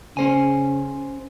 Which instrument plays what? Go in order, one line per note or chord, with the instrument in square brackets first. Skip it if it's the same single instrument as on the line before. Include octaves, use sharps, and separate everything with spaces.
[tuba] C#3 [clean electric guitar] C#4 C5 G#5